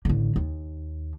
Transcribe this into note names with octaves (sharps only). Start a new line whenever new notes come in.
A1 D3
D#2